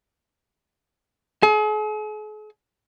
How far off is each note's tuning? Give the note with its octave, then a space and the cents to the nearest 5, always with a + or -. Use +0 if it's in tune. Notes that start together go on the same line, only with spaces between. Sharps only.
G#4 +45